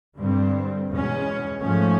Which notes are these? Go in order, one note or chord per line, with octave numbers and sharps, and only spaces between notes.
G2 D3 G3 C4
E2 B2 G#3 C#4
G#2 F3 A3 C#4